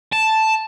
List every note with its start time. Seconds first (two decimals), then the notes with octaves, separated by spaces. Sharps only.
0.13 A5